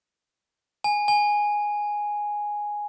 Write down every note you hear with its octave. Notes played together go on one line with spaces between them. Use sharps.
G#5
G#5